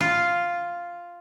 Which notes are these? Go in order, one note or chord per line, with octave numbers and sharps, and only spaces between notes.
F4